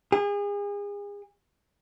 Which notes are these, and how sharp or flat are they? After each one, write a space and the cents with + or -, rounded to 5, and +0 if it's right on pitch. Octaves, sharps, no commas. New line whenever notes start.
G#4 -35